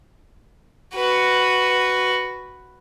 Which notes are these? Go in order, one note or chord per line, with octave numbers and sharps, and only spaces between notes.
F#4 B4